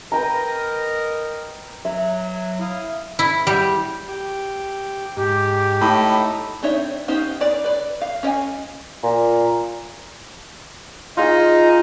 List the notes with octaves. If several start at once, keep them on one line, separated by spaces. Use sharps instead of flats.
A#4 B4 D#5 G5 A#5
F#3 E5
E4 F5 D#6
E4
G3
G4
G#2 G4
A2 A3 D#4 B5
C4 D4 D#4 C#5 E5
B3 C#4 D#4 G4 C5
G#4 B4 D5 A#5
B4 D5
F5
C#4 C#5 D#5 G#5
A#2
D#4 F4 G#4